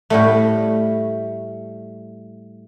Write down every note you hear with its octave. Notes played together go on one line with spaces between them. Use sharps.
A2 G3 A3